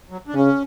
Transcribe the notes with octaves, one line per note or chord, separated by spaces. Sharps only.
F#3
D4
C#3 C#4